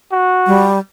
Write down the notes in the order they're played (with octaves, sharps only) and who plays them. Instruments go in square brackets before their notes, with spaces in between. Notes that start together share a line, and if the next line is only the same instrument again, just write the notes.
[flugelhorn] F#4
[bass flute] G3